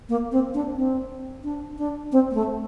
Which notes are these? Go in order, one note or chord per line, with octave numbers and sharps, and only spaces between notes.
A#3
C4
D4
C4
D4
D4
C4
A#3
A3